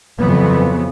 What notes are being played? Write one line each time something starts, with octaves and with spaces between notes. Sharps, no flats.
F2 C#3 E3 F#3 B3